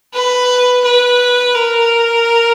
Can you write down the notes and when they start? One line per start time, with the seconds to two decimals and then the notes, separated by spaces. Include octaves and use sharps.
0.14 B4
0.85 B4
1.55 A#4